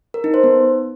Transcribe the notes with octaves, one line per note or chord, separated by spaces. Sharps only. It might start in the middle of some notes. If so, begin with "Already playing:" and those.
A#4
D#4
C5
B3